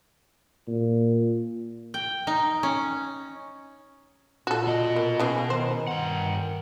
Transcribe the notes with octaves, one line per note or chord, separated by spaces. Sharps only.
A#2
G5
D#4
C#4
A#2 F#4 A4
B2 D#5
A#3
C#3 E3 G#4
D#3 C5
G2 F#5